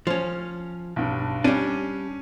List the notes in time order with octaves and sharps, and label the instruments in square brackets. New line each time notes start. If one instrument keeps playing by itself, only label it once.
[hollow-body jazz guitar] F3 C#4
[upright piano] B1 G2
[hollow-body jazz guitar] G3 D4 [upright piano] C#4 D#7